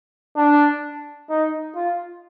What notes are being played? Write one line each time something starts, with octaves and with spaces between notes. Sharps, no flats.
D4
D#4
F4